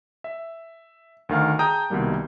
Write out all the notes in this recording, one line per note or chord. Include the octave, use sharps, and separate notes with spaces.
E5
D2 D#3 F5 F6
G#4 G5 A5 A#5 D#6 G6
C2 B2 D#3 G3 A#3